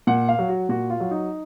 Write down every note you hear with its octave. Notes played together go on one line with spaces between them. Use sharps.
A#2 F#5
F5
F#3
F#4
A#2 F#4
F4
F#3
D#4